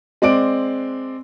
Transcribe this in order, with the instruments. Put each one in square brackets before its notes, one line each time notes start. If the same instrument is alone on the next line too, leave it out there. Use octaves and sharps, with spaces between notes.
[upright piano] G#3 C4 D5 D7